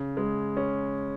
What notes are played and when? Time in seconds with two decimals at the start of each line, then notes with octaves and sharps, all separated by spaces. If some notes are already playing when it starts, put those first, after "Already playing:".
Already playing: C#3
0.17 G#3
0.57 C#4